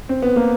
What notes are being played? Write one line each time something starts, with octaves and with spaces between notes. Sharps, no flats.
C4
B3
A#3